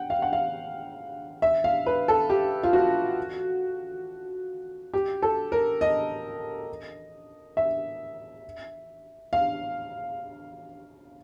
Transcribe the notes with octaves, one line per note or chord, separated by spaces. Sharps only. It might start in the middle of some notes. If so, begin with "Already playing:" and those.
Already playing: F#5 G5
F5
F#5
F5
E5
F5
B4
A4
G4
F4
F#4
G4
A4
A#4
D#5
E5
F5